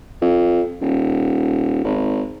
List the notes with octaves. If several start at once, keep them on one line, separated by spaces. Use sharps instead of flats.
F2
D#1
G#1